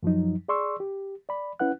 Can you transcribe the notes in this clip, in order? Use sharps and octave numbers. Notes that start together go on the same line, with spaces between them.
F#2 F3 F#3 D#4
G#4 D5 C6 C#6 E6
G4
D5 B5
C#4 E4 B4 F#5 F#6